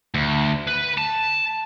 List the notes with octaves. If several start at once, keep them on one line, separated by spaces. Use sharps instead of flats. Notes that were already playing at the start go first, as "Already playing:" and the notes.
D2
B4
A5